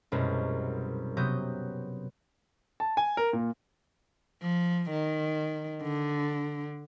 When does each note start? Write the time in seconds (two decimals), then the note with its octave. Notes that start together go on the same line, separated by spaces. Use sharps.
0.12 C2 F#2 B2 G#3
1.17 C3 F#3 B3 D#6 G6
2.80 A5
2.97 G#5
3.17 A#4
3.33 A#2
4.42 F3
4.91 D#3
5.82 D3